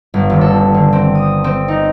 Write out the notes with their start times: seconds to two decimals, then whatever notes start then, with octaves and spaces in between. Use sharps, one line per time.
0.14 G1
0.30 D#1
0.41 A4
0.74 D3
0.93 C4
1.15 D#6
1.44 C4
1.68 D#4